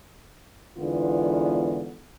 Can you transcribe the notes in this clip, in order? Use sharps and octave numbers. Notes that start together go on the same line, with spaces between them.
E2 G#2 D3 B3 F4